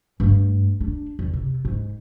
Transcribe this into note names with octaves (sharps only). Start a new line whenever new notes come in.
G2 A3
D4
E2
C3
G#2